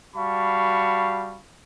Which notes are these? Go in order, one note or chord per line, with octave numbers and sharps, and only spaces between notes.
G3 F#4 F5 A5 B5 C#6